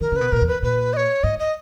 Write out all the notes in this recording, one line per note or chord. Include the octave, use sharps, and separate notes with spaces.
D#3 A#4
C#3 B4
B2
A#2 A#4
E2
B4
A#2 B4
D#5
C#5
G#2 D#5
D#5